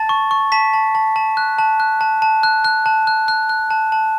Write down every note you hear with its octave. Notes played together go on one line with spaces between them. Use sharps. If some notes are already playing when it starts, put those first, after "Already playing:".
Already playing: A5 A6
C#6
C#6
A5 B6
A5
A5
A5
F#6
A5
F#6
A5
A5
F#6
F#6
A5
F#6
F#6
F#6
A5
A5